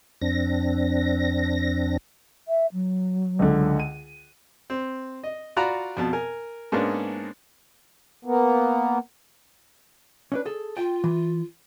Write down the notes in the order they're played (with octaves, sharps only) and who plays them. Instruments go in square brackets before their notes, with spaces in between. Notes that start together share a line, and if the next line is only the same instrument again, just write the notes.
[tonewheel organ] F2 C4 D4 A#6
[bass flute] E5
F#3
[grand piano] C#2 D3
D#7
[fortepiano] C4
D#5
F4 F#4 D5 F#5 A#5 B5
F2 B2 A5
A#4 G#5
G#2 G#3 A#3 B3 C#4 D4
[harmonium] A#3 B3
[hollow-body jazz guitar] C#4 D4 B4
G#4 A4
[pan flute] F4 [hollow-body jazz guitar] G5
[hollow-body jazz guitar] E3